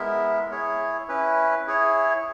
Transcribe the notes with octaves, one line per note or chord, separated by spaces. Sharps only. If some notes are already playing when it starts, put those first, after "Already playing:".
Already playing: G#3 B3 E4 A#4 E5
E4 G#4 C#5
C#4 E4 B4
E4 G#4 C#5